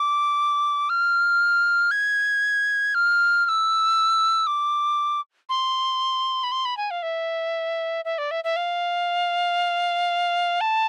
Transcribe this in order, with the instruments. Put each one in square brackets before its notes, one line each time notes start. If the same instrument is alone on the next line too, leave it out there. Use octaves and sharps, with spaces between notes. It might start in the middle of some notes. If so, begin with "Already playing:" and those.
Already playing: [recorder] D6
F6
G#6
F6
F6
E6
D6
C6
B5
C6
B5
G#5
F5
E5
E5
D5
E5
E5
F5
A5